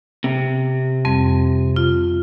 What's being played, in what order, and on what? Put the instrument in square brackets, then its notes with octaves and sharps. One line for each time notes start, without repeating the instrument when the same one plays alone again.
[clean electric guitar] C3
[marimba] F2 G3 C4
F4